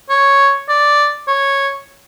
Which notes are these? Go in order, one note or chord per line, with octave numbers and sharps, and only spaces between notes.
C#5
D5
C#5